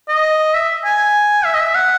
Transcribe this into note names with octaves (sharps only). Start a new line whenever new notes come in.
D#5
E5
G#5
E5
D#5
E5
F#5